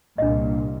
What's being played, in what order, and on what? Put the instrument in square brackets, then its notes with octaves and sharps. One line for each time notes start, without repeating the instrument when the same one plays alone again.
[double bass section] C2 A#2 [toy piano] D4 D#5